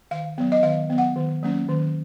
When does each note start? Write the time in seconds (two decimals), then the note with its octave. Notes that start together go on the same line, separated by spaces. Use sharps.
0.11 D#3 F5
0.38 F#3 B3
0.52 D#5
0.63 D#3 F5
0.90 F#3 B3
0.98 F#5
1.16 D#3
1.43 F#3 A#3 C#4
1.69 D#3